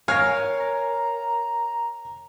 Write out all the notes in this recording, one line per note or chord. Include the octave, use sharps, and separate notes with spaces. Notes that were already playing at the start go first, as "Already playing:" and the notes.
A#4 C#5 F5 G#5 F6
A#5